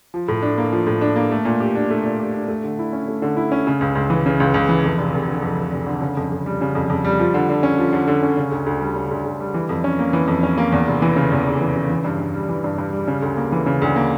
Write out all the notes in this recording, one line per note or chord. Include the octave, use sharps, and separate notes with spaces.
F3
A2
D4
A#3
F3
A2
D4
A#3
A3
A#2
G4
D4
A3
A#2
G4
D4
A3
D3
E4
C#4
A3
D3
E4
C#4
C#3
C#2
C#2
E3
C#3
C#2
C#2
E3
F2
F1
F1
D3
F2
F1
F1
D3
C#3
F2
F2
G3
C#3
F2
F2
G3
F3
D3
D3
C#4
F3
D3
D3
C#4
C#3
D2
D2
G3
C#3
D2
D2
G3
E3
F2
C#4
A#3
E3
F2
C#4
A#3
E2
F1
E3
C#3
E2
F1
E3
C#3
E3
G2
G2
G3
E3
G2
G2
G3
C#3
D2
A#3
E3
C#3
D2
A#3